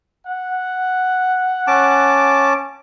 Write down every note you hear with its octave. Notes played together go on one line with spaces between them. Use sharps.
F#5
C#4 A5 D6